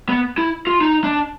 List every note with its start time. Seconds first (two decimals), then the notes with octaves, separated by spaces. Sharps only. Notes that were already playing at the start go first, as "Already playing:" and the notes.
0.09 B3
0.38 E4
0.67 F4
0.81 D#4
1.04 D4